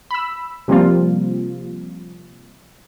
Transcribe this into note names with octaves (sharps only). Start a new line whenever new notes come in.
B5 E6
C3 F3 G3 A#3 C4 F4